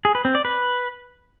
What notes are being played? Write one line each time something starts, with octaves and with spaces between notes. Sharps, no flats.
G#4
B4
C4
D5
B4